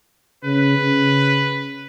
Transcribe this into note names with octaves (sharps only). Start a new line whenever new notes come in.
C#3 B4
C#3